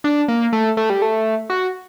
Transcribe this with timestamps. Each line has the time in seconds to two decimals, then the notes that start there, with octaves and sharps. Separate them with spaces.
0.04 D4
0.28 A#3
0.53 A3
0.77 A3
0.90 G3
1.02 A3
1.50 F#4